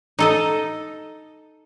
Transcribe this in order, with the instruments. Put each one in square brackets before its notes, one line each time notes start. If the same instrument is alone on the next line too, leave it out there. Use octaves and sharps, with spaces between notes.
[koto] D#4 A4 D#5